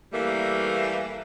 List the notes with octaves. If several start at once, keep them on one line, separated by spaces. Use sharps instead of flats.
E3 G3 A3 A#3